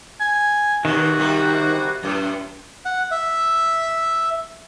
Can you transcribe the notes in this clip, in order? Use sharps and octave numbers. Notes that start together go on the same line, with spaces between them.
G#5
D#2 C3 D#3 F#4
C3 G3 A#3
F#2 A2
F#5
E5